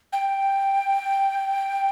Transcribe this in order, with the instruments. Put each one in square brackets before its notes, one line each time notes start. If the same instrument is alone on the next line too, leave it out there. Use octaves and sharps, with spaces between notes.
[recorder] G5